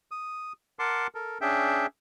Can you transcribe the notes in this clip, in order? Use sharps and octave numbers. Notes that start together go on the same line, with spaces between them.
D#6
A#4 F#5 A5 C6 D6
A4 A#4
C#4 D4 G#4 E5 G5